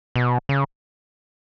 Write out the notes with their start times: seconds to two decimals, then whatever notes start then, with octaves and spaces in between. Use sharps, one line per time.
0.16 B2
0.49 C#3